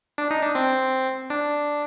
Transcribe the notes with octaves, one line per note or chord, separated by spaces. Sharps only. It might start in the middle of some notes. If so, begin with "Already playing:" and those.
D4
D#4
D4
C4
D4